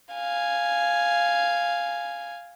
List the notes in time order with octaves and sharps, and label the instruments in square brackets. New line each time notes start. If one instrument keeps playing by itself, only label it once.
[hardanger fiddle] F5 G#5